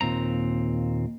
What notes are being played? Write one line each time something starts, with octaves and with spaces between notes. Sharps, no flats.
D#2 A#2 C4 A#5